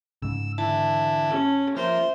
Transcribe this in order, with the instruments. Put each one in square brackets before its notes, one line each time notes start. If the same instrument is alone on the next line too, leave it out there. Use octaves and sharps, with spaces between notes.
[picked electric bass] G#2 C#3 [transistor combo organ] E6
[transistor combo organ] D3 E3 E4 [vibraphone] A5
[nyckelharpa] C#4
[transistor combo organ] F3 A#3 [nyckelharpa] C5 [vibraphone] E5